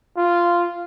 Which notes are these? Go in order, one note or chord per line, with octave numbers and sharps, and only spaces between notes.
F4